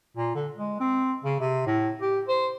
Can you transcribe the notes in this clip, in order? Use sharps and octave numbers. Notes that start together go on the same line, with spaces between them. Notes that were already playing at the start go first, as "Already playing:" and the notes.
A#2
D3
G#3
C4
C#3
C3
A2
G4
C5